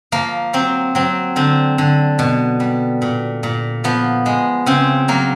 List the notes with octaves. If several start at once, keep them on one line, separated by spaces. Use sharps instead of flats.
F3 A#3
F#3 C4
F#3 C4
D3 C4
D3
B2
G3
A#2
A#2
F3 B3
G#3
C#3 C4
F#3 A#3